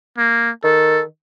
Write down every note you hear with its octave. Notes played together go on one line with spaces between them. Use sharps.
A#3
D#3 A4